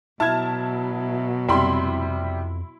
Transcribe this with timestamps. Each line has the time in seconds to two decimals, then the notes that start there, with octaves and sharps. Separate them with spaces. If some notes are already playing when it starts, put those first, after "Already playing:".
0.20 B2 F#3 E4 A5 F6 G#6
1.48 F2 C3 F3 G3 E4 B5 C6